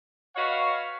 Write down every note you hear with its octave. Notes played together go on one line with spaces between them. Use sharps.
F#4 B4 C#5 D#5 F5